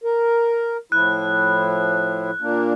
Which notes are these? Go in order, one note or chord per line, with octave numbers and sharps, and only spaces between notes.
A#4
A2 F3 E4 F#6
A#2 A#3 D4